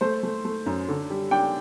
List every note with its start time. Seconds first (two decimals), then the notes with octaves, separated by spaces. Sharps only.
0.01 A3 C5
0.23 A3
0.45 A3
0.66 F#2
0.88 D3
1.10 G3
1.31 D4 G5